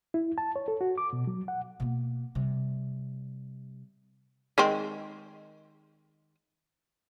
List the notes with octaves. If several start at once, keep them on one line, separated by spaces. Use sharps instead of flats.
E4
A5
C#5
A4
F#4
D6
B2
F#3
F#5
B2 A#3
C3 G3
D#3 G#3 C4